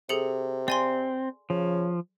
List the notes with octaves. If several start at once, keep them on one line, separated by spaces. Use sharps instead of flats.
C3 G#4 A4 C#7
C4 D5 G#5 C6
C#3 F3